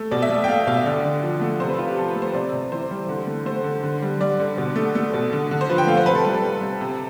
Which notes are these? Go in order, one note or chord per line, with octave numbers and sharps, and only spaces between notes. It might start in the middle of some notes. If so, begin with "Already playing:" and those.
Already playing: A3
B2 D5
E5
A3 D5
G5
A3 F5
B2 F5
E5
D3 D5
D3
F3
A3
C3 C5
B4
C3 F4
G4
F3 A4
B4
A3
C5
C3 D5
C3
E3 C5
G3
D3
A3
A3 C5
D3
D3
G3
G3 D5
D3
B2
A3
A3
B2
D3
D3
C5
F3 B4
G5
A3 F5
C5
C3 B4
A4
G3 B4
A4
G3
C3
C3